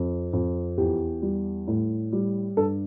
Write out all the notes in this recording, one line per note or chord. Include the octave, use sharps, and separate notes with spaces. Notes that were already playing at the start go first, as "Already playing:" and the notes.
Already playing: F2
F2
E2 G4
G3
A2
G3
G2 A4